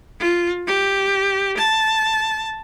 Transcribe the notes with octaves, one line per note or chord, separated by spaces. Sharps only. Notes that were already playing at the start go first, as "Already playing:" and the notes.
F4
G4
A5